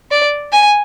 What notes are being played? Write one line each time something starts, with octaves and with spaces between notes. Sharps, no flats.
D5
G#5